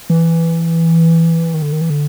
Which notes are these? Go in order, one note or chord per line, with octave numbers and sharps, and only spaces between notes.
E3
D#3
D3
D#3
E3
D3